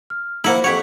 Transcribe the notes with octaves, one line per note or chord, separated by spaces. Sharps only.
F6
F3 A#3 E4 C5 E5 F#5 B5
F2 G4 C#5 F#5 C#6 G#6 B6